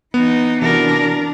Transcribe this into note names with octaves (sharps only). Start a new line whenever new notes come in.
E3 B3 D#4
C3 E3 D4 F#4 A#4